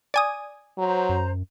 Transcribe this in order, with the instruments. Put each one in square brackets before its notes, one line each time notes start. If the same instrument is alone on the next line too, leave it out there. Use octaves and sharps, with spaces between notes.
[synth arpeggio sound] D5 G#5 D#6
[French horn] F#3 [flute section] C5 A#5
[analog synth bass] F#2